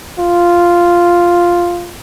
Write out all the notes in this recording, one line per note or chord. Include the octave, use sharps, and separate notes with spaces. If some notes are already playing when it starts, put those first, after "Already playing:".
F4